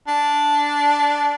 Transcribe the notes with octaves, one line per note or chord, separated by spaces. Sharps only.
D4